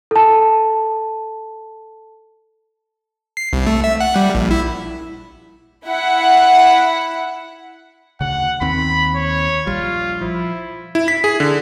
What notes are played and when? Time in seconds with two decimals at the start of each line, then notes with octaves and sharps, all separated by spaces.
0.11 A4 A5
3.37 C7
3.53 C2
3.67 A3
3.84 E5
4.00 F#5
4.16 G3
4.35 A#1
4.51 E4
5.86 E4 F#5
8.21 D2 C#3 F#5
8.61 D#2 D#3 C4 B5
9.16 C#5
9.67 A#1 G3 F4
10.21 F3 E4
10.95 E4
11.08 B6
11.24 G#4
11.40 D3